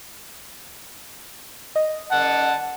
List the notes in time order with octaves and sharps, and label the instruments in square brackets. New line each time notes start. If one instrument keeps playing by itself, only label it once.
[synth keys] D#5
[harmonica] F#5 A5